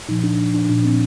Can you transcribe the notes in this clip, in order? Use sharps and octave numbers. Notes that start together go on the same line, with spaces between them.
A#2 F3 D#4
D4
D4
A#2 F3 D4
C4